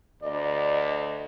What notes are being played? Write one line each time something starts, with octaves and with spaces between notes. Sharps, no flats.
D2 D5 D#5